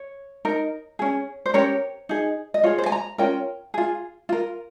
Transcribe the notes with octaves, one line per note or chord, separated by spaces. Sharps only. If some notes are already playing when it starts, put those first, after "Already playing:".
Already playing: C#5
D#4 A#4
C#4 G#4
C5
C#4 G4 A#4 C#5
D#4 G#4
D#5
F4 G#4 C#5
C5
G#5
A#5
C#4 F4 A#4 G5
F4 G#4
F4 A#4